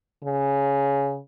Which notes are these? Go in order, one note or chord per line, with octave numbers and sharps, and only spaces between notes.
C#3